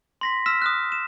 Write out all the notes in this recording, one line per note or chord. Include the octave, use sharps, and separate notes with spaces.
C6 A#6 B6
E6 F6 B6 E7
D#6 F6 F#6
E7